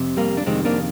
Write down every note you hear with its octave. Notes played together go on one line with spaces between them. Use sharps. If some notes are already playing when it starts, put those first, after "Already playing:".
Already playing: F2 C3
G3 A#3
D4
F2 C3 D#3 G#3 C4
A#3 D4